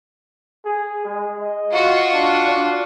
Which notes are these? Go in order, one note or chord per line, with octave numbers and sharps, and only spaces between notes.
G#4
G#3
D#5
F4 F#4
D4
D4